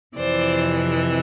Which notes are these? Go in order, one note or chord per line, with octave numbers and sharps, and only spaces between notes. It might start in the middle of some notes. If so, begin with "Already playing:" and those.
F2 C3 E3 C5 D5